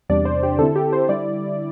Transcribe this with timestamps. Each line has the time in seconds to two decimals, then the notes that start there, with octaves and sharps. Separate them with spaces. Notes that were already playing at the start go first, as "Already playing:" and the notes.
0.09 E2 C3 G3 D4 D5
0.25 C5
0.43 G4
0.59 D3 C4 E4 A4
0.76 G4
0.93 C5
1.09 D3 G3 E4 D5